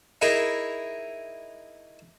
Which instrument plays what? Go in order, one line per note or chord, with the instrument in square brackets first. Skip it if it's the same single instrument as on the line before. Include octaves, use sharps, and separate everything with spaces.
[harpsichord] D#4 E4 G#4 A#4